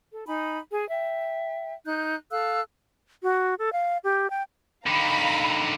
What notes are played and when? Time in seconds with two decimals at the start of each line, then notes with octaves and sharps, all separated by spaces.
0.11 A4
0.27 D#4 G#5 B5
0.71 G#4 G#5
0.90 E5 G5
1.85 D#4 F#6 G6
2.31 A4 F5 E6 F#6
3.23 F#4
3.59 A4
3.73 F5
4.04 G4
4.30 G5
4.87 D3 D#3 F5 A#5 B5